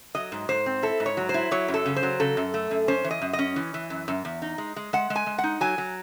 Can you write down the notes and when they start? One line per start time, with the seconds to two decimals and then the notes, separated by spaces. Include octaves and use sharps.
0.15 F#3 D#5
0.32 G#2
0.49 G#2 C5
0.66 C4
0.83 E4 A4
1.00 G#2
1.06 C#5
1.17 F#3
1.29 C5
1.34 E4
1.51 F#3 C#5
1.68 F#2
1.74 A4
1.86 C#3
1.96 C5
2.03 F#3
2.20 C#3 A4
2.37 F#2
2.54 A3
2.71 F#2
2.88 C#4 C5
3.04 E3
3.11 D#5
3.22 F#2
3.33 D#5
3.39 C#4
3.56 E3
3.74 E3
3.90 F#2
4.08 F#2
4.25 E2
4.42 D#4
4.58 G#3
4.76 G#3
4.93 G#3 F#5
5.10 G#3
5.16 G#5
5.26 G#3
5.38 F#5
5.44 D#4
5.61 F#3 G#5
5.78 F#3